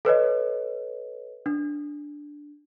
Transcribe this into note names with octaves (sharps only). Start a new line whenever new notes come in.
A4 B4 C#5 D#5
D4